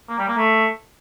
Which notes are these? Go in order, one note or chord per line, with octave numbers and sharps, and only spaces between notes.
A#3
G3
A#3
A3